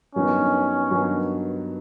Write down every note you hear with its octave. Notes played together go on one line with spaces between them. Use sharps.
G2 D#3 F#3 B3 C#4 D#4
G2 D#3 F#3 B3 D#4